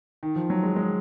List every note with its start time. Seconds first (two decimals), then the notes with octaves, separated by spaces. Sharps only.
0.23 D#3
0.36 F3
0.50 F#3
0.63 G#3
0.76 G#3